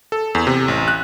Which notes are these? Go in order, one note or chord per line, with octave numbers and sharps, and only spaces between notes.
A4
E2
C3
A1
F#6